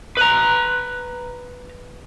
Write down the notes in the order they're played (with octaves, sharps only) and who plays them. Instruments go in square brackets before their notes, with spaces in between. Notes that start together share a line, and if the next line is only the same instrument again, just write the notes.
[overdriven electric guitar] B4 A#5